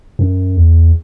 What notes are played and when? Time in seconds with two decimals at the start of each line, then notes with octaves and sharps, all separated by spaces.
0.19 F#2
0.57 E2